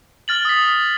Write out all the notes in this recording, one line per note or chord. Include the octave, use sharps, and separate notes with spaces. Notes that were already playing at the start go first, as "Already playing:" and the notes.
F6 A6 F#7
D#6 B6